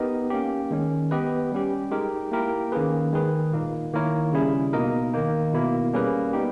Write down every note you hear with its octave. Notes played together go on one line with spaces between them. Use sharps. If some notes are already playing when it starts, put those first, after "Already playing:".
Already playing: B3 D#4 G4 A#4 D#5
A#3 C#4 G4
D#3 G#3 C#4
B3 G4 B4 D#5
G3 C#4 G4
G#3 D#4 G4 A#4
A#3 E4 G4 A#4
D#3 A#3 C#4 G#4 B4
D#3 G#3 D#4 G#4 B4
A#2 A#3 D#4
D#3 A#3 E4 A#4 C#5
C#3 G3 C#4 E4 G#4
B2 A#3 D#4 A#4 D#5
D#3 A#3 D#4
B2 A#3 E4
G3 A#3 C#4 G#4 B4
G3 B3 D#4 G4